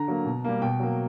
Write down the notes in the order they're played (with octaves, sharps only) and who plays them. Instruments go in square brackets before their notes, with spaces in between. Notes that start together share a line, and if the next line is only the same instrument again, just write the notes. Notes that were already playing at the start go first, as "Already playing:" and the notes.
Already playing: [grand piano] D3 A#5
F#3 A#3
B2
G3 A#3
B2 G5
F#3 A#3